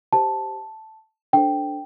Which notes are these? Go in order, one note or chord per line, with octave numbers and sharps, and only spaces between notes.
G4 C5 A5
D4 A4 C5 G5